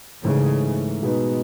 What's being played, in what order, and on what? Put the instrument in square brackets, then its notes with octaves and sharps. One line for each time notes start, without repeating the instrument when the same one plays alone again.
[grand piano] G#2 E3 A3 [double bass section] C#3
[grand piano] B2 G#3 B3 D#4